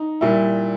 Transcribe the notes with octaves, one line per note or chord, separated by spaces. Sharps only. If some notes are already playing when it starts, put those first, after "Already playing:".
Already playing: D#4
A#2 G3 E4